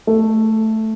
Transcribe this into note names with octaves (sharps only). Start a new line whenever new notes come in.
A3